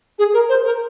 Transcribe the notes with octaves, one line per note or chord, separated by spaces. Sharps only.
G#4
A#4
C5
A#4